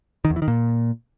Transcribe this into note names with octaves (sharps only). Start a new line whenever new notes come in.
D#3
E2
E3
D#3
A#2